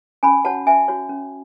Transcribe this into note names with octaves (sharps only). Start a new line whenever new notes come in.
C#4 G#5 B5
F#4 C#5 F#5 A5
C#4 E5 G#5
F#4 C#5
C#4